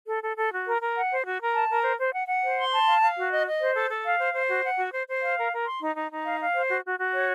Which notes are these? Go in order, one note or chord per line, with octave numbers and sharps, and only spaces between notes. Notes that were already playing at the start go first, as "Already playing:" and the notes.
A4
A4
A4
F#4
A#4
A#4
F#5
C5
F#4
A#4
A5
A#4
C5
C5
F#5
F#5
C5
C6
A5
F5
F5
F#4
D#5
D#5
C5
A4
A4
F5
C5
C5
F#4
F#5
F#4
C5
C5
F5
A#4
A#4
C6
D#4
D#4
D#4
F5
F5
C5
F#4
F#4
F#4
C#5